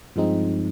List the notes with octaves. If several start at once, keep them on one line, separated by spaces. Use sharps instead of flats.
G2 F3 G#3 C4 D#4